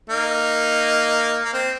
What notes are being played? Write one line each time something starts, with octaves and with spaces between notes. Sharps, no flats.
A#3 D#4
A#3
C4